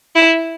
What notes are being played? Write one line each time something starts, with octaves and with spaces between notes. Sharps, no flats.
E4